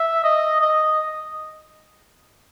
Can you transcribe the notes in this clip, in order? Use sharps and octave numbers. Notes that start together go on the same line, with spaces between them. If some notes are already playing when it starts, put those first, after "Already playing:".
Already playing: E5
D#5
D#5